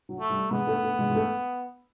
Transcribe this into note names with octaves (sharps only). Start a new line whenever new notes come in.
F#3
A3
G3
G#3 B3
A3
A3
G#3
G#3
A3